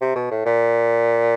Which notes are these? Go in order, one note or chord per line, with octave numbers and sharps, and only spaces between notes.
C3
B2
A2
A#2